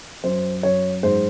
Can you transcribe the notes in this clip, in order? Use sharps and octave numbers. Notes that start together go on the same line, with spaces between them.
F#2 C5
F#2 C#5
G#2 C5